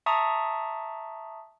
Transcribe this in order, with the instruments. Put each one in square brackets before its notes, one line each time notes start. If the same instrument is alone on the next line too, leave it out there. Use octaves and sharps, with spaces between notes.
[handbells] E5 A5 A#5 C#6 D#6